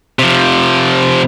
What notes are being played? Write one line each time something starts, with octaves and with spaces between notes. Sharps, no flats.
C3 F3